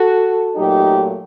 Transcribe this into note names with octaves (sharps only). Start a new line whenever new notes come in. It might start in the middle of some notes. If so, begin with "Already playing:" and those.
Already playing: F#4 A4
A#2 F#3 A3 D#4 G4